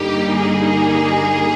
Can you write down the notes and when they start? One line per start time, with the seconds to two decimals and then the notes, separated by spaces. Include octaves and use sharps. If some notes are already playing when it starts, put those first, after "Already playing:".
Already playing: G2 D3 G3 A#3 D#4 G4
0.34 G#4